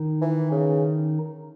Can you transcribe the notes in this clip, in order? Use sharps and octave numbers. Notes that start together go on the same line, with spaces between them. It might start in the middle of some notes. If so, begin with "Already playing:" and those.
Already playing: D#3 D#4
E3
C#3